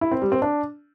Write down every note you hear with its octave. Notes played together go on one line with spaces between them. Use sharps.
E4
C4
G3
C4
D4